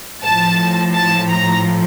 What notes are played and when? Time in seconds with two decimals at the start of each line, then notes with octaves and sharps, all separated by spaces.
0.23 A2 F3 A5
0.95 A5
1.30 A#5